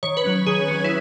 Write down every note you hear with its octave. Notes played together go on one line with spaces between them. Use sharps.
D#3 C#5
B4
F#3 C#4
D#3 G#4
F#3 C#4
E4